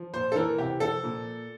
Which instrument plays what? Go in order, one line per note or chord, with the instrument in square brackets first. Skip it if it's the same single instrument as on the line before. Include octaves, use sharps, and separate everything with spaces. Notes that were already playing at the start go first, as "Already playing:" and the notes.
Already playing: [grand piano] F3
A#2 C5
A4
E3 A#4
C3 G4
F3 A4
A#2